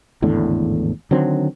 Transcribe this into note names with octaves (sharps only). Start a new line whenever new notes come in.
G#1 E2 A2 D3
D3 D#3 F#3 C4